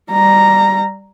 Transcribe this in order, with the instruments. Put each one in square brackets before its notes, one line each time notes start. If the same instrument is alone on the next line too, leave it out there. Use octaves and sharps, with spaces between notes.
[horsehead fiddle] G3 A#5